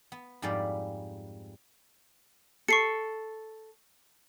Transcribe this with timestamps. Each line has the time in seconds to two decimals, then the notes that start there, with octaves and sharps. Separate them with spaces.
0.12 B3
0.42 F2 G#2 G3 B3 D5 F5
2.68 A4 C#6 C7 C#7